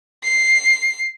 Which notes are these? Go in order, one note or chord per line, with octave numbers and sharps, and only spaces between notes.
C7